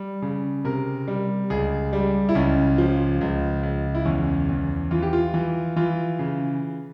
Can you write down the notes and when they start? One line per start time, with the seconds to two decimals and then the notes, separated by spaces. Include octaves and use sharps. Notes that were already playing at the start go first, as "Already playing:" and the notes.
Already playing: G3
0.22 C#3
0.65 C3 A#4
1.08 G3
1.50 C#2 G#4
1.93 G3
2.29 E4
2.35 C#2 C#4
2.78 F3
3.21 C#2
3.63 C#2
3.95 E4
4.05 E2 C#4
4.49 E2
4.91 E3 F4
5.02 G4
5.13 F4
5.34 E3
5.76 E3 F4
6.19 C#3